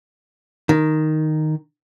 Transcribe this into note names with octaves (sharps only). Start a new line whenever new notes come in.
D#3